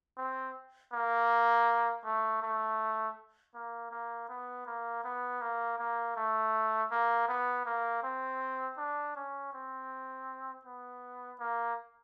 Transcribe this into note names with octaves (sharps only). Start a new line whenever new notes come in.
C4
A#3
A3
A3
A#3
A#3
B3
A#3
B3
A#3
A#3
A3
A#3
B3
A#3
C4
D4
C#4
C4
B3
A#3